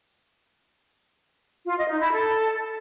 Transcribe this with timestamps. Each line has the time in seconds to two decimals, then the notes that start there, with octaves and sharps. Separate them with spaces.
1.66 F4
1.77 D#5
1.89 D#4
2.00 E4
2.12 A4